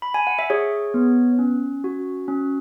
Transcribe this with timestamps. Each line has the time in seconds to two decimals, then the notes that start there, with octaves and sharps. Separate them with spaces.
0.02 B5
0.14 G#5
0.27 F#5
0.39 E5
0.50 G#4 C#5
0.94 B3
1.39 C#4
1.84 F#4
2.28 C#4